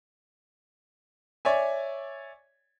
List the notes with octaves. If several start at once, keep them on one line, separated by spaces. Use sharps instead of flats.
C#5 D5 E5 G#5